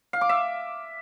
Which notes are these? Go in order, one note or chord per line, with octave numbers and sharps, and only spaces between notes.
F5
D6
E5